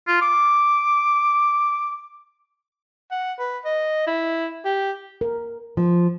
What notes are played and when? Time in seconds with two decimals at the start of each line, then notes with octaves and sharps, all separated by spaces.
0.08 F4
0.22 D6
3.11 F#5
3.39 B4
3.65 D#5
4.07 E4
4.65 G4
5.21 A#4
5.77 F3